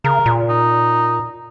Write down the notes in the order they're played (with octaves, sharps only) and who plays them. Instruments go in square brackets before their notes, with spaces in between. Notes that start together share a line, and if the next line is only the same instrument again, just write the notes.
[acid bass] C#3 [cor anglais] A#4
[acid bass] A#2
[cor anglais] D#4